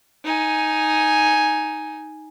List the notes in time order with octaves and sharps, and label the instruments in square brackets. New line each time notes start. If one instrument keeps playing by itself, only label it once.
[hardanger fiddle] D#4 G#5